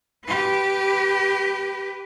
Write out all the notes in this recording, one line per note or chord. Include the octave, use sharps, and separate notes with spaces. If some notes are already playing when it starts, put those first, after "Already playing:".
G4 B4